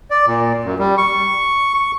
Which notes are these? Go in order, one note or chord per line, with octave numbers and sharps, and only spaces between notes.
D5
A#2
F#2
G3
C#6
C#6